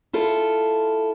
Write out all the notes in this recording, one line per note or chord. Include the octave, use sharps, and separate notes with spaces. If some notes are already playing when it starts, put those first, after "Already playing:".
E4 F4 A4